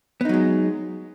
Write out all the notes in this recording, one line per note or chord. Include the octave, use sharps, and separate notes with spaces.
F#3 G#3 B3 D#4